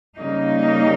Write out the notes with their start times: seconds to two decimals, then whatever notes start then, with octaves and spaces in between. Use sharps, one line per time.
0.17 C#3 G3 A#3 D#4